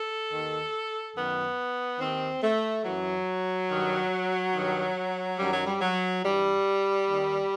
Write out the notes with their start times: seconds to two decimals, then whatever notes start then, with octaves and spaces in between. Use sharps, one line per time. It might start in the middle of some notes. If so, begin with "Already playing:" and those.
Already playing: A4
0.31 D#2 D#3
1.16 F#2 D#3 B3
2.00 D#2 D#3 C4
2.42 A3
2.85 F#2 E3 F#3
3.70 G2 D#3
4.54 G2 D#3
5.39 F#2 D#3 G3
5.52 F#3
5.65 G3
5.81 F#3
6.23 G2 E3 G3
7.08 D#2 D#3